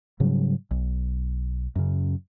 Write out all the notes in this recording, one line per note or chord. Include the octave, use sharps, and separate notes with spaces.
G#2 C#3 F#3 G3
B1
F#2 C#3